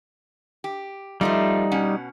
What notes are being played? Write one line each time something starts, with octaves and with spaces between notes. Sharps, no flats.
G4
F3 G3 A3 D#4 F4
B2 C#4 F#5